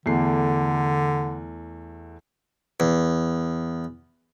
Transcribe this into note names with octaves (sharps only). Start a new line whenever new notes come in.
E2 D3 A3 C7
E2